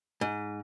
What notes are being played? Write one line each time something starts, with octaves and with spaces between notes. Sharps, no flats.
G#2